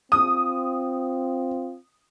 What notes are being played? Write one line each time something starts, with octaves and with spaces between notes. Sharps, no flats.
C4 F4 D#6